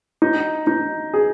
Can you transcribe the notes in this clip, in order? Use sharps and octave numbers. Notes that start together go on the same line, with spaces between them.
D#4
D#4
G#4